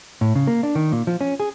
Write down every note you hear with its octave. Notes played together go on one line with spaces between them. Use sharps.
A2
C#3
A#3
D4
D#3
A#2
F3
C#4
G#4